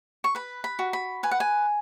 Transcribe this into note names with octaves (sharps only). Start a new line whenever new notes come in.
C#6
B4 B5
B5
F#4
B5
B4 G#5
F#5
G#5